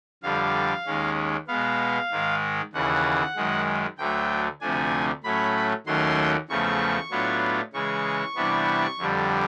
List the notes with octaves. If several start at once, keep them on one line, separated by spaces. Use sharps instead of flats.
F2 D3 G3 F5
D#2 D#3 G#3 C#4
B2 G#3 B3 F5
G#2 D#3 G#3
D#2 C#3 E3 F#5
F#2 D#3 G#3
D2 D3 F#3 A3 G5
D2 C3 F3 A3 D4 G#5
A2 F#3 A3 C#4 B5
D#2 D#3 F#3 A3 C#4 C6
E2 C#3 F3 A3 C#6
A2 F#3 B3 D4 F4
C#3 E3 G#3 C#6
C3 E3 G3 B3 D4
F2 D3 G3